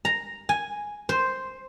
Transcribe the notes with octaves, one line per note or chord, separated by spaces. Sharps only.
A#5
G#5
C5